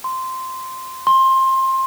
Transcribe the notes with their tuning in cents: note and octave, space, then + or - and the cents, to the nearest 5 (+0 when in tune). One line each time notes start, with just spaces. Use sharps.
C6 -10
C6 +20